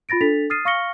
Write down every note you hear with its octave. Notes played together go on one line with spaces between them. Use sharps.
F4 B5 A6 A#6 D7
D4 A4 A6 B6 F7
D#6 F6 A6 C7 D#7
F5 C#6 F6 A#6 C#7 G7